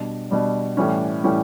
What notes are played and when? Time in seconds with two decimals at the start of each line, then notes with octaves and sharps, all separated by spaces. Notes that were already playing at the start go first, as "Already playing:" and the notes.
Already playing: B2 G3 D4
0.30 B2 G3 D4
0.77 A2 E3 G3 C#4
1.24 A2 E3 G3 C#4